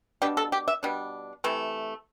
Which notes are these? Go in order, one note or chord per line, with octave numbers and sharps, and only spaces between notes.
B2 G3 D4 G4
A4
G4
E5
B2 G3 D4
C3 E3 A3